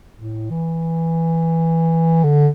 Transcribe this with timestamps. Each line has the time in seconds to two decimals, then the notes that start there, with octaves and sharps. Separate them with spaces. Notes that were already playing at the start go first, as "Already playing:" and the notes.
0.16 A2
0.50 E3
2.23 D3